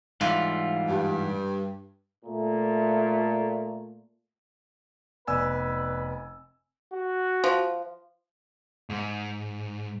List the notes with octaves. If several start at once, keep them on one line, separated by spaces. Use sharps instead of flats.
G#2 E3 G3 F4
G2
A#2 A3
F1 B3 B4 D5 G#5 E6
F#4
F3
G#2